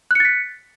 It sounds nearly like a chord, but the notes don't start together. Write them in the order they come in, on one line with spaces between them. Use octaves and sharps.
F#6 C#7 A6 B6